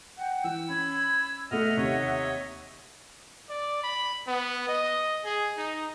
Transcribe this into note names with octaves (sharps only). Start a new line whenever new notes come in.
F#5 G5
E3 E6
C#4 B5 G#6
B2 A3 A4 D#5 E5 F#5 F6
D#2 C3 C#5 D#5
D5
B5
B3
D#5
G#4
D#4